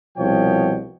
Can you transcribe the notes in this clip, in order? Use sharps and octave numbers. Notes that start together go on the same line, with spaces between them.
C2 B2 F3 C#5 G5